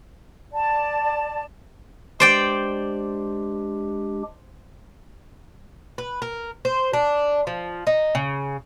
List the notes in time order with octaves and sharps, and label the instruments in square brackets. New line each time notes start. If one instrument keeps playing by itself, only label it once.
[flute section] D5 A5
[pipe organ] G#3 D4 G4 [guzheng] C5 D5 G5
[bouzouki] B4
A#4
C5
D4
F3
D#4
C#3